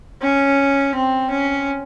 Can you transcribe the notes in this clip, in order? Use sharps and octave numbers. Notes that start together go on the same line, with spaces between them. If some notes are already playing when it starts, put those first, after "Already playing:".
C#4
C4
C#4